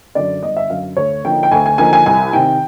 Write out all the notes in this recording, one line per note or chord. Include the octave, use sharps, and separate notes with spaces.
F#2 D3 D5
G1 D#5
E5
F#2 D3 F5
D2 C#5
D3 F3 A#3 D#4 G5
G5
D2 G#5
G#5
D3 F3 A#3 D#4 G#5
G#5
C2 G#5
C3 D#3 G5